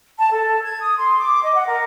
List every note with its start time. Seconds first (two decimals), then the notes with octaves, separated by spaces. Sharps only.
0.18 A5
0.31 A4
0.63 G#6
0.82 D#6
0.97 C6
1.19 D6
1.42 D#5
1.54 F#5
1.68 A#4